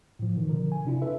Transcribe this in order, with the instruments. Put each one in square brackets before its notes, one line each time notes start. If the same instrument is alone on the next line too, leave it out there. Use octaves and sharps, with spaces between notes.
[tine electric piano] A2 F3
B2 D#3
D3 F3 A#4
G#5
C3 D4 E4 F4
F4 A4 B4 E5